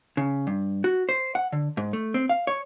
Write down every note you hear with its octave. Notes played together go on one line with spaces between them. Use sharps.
C#3
G2
F#4
C5
F#5
D3
G#2
A3
C4
F5
C#5